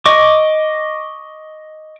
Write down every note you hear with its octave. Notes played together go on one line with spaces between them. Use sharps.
D#5 C#6 D6